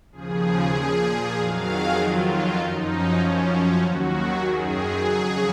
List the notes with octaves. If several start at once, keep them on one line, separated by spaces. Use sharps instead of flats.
D#2 C#3 F3 G#4
A#2 F3
F2 D#3 F#3 F5
G#4
F2 D#3 F#3 F4
F#2 F3 D#4
C#4
F#2 F3
C#4
D#2 D#3 F#3 F#4
F#2 D#3 F#3 G#4
G#4
F2 C#3 F#3